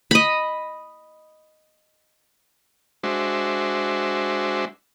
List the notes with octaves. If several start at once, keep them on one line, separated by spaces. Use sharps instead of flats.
D#5 B5
G#3 D4 F#4 C5 E5